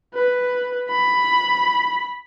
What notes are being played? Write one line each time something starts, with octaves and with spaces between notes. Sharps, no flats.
B4
B5